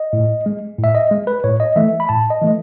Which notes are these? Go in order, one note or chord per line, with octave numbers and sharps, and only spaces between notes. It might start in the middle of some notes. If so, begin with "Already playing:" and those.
Already playing: D#5
A2
G#3
A2
E5
D#5
G#3
B4
A2 C#5
D#5
E3 A3 E5
B5
A2 A5
D#5
E3 A3